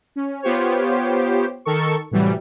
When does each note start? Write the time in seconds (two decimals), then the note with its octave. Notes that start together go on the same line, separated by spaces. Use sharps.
0.16 C#4
0.42 B3 F4 G4 C5 C#5
1.65 D#3 A4 A#4 C#6
2.11 A2 C3 E3 F#3 G3